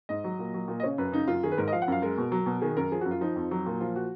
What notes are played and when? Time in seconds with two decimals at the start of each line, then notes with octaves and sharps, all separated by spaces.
0.09 G#2 D#5
0.24 F#3
0.39 A#2
0.54 F#3
0.68 A#2
0.80 D#5
0.83 C#3 C#5
0.98 F#2 B4
1.12 C#3 D#4
1.27 F#2 F4
1.43 D#3 G#4
1.51 B4
1.58 G#2 A#4
1.68 D#5
1.72 F3 F5
1.82 F#5
1.88 F#2 F5
2.02 G#3 A#4
2.18 B2
2.32 F#3
2.46 B2
2.62 D#3 G#4
2.77 F#2 A#4
2.92 F3 G#4
3.01 F#4
3.06 F#2
3.11 F4
3.21 F3 D#4
3.36 F2
3.51 F#3
3.66 A#2
3.80 F3 F4
3.96 F#4